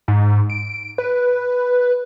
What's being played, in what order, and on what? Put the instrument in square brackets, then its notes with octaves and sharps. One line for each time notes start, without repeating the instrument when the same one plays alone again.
[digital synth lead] G#2
D7
B4